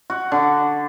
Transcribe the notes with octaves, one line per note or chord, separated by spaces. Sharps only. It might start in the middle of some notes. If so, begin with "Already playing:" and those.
F#4
D3